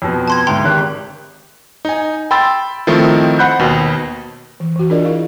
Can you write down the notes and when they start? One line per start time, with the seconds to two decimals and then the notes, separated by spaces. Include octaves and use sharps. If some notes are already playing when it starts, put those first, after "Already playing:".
0.02 F2 B2
0.28 A5 C6 G#6
0.47 D2 G#2 G5 A#5 C6
0.65 G#1 G4 F#6
1.85 D#4 G#5
2.31 G5 B5 C6 E6 A6
2.87 D#3 F3 A3 C4 D#4 E4
3.39 C5 F#5 B5 F#6 G6
3.59 D#2 B2
4.60 E3
4.76 E3 F#4
4.90 D4 F4 G#4 A#4 D5 D#5
5.05 E4 F5